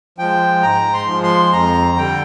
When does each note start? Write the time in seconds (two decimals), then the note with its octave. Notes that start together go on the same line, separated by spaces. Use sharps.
0.18 F3 G#3 G5
0.63 G#2 A#5
0.94 C6
1.07 F3
1.13 G#3
1.23 C6
1.52 F2 A#5
1.97 D3 G3 G5